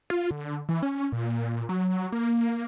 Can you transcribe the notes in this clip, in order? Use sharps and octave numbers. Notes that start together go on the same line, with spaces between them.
F4
D3
E3
C#4
A#2
F#3
A#3